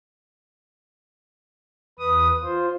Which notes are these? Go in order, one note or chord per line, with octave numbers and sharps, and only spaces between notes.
E2 B4 D#6
F4 C5